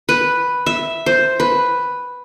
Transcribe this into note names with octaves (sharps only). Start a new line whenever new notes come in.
B4
E5
C5
B4